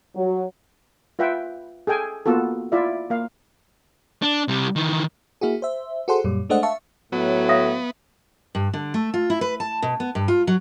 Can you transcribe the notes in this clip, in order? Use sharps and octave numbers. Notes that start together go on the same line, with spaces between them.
F#3
F4 B4 E5 F#5 G5
G#4 A4 G5 G#5
A#3 B3 F4 F#4 A4
E4 F4 D5 E5
A#3 F5
D4
C3 G3
D#3 E3
A#3 E4 F#4 G#4
C5 E5
F#4 G#4 A4 C5 F#5 C6
F#2 A#2 G3
G#3 A3 D4 C5 D#5 F#5
E5 F5 A5 C#6
A2 F#3 B3
E5 F5 D#6
G2
D3
A3
F4
E4
B4
A5
B2
B3
G2
F4
F#3